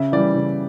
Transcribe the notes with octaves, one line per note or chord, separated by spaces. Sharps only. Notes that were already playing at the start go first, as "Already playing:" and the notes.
Already playing: C#3 E5
E3 G3 D5
C#3